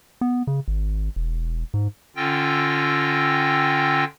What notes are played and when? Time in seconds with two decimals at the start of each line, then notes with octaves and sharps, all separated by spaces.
0.21 B3
0.47 C#3
0.68 G#1
1.16 E1
1.74 G#2
2.16 D3 C#4 F4 G5 E6 A#6